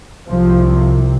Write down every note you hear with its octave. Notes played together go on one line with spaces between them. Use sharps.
C2 C3 F3